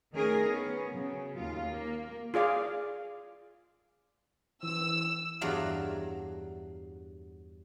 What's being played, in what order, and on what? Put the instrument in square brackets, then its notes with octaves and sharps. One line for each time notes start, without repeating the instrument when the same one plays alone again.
[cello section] D#3 A3 C#4 G#4 A#4
B3 C#4
C#3 F#3
D#2 F4
A#3
[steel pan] F4 G#4 D5 F5
[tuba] E3 [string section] E6
[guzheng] E2 G2 F#3 D5 F5 A#5